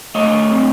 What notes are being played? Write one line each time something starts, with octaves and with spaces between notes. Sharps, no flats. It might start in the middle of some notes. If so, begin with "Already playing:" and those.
A3 C#5 D#5
C4